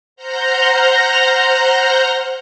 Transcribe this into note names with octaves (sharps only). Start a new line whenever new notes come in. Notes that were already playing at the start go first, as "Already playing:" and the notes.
C5 F#5 A#5 F6 G6 A#6